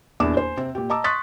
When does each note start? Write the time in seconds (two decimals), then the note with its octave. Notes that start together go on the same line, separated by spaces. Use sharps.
0.20 D#1 E2 D4 E4 D6 E7
0.37 C5 G#5
0.57 C3 C4
0.75 A#2 G4
0.90 D#5 A5 A#5 D6 E6
1.04 C6 C#6 D#6 F#6 A6 B6